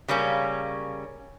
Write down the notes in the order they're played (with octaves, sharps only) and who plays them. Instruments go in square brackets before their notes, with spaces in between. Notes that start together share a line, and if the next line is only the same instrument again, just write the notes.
[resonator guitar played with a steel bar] C#3 G3 A#3 C#4